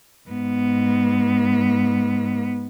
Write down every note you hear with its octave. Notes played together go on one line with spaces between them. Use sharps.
G#2 B3